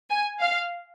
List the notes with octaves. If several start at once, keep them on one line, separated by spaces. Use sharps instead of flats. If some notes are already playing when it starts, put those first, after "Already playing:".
G#5
F5